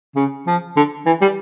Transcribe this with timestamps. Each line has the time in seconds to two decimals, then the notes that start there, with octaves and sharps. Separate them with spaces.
0.15 C#3
0.46 F3
0.76 D3
1.06 E3
1.21 G3